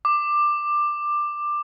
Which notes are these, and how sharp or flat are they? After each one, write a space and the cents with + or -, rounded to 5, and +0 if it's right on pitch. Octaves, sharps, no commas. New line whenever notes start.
D6 +15